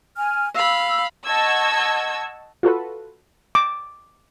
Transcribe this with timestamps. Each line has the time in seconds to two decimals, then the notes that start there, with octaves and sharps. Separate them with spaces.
0.17 G#5 F6
0.54 F5 B5 E6
1.26 D#5 F#5 A5 C#6 E6 G#6
2.63 F4 F#4 A4 B4
3.55 D6